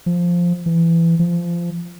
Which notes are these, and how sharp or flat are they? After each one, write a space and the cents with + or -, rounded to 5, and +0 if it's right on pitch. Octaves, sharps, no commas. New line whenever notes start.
F3 +0
E3 +20
F3 -20